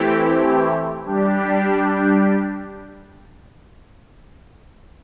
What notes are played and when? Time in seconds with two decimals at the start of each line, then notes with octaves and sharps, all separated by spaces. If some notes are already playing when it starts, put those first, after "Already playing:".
Already playing: E3 A3 C4 E4 G4
1.05 G3 D4 G4